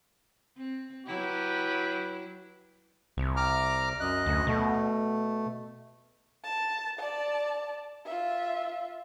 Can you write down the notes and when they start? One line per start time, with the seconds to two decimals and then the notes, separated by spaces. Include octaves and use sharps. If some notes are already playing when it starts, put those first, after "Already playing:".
0.57 C4
1.07 F#3 E4 G4 B4
3.17 C2
3.36 A#5 D6 F6
4.00 F#2 D#5 F#6
4.26 D2
4.47 B2 A3
6.44 A5
6.99 D5 A5
8.05 F4 E5